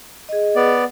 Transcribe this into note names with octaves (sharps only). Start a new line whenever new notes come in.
G#4 D#5
B3 D5